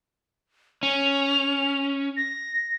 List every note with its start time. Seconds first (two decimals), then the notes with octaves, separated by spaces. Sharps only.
0.83 C#4 F7
2.17 A#6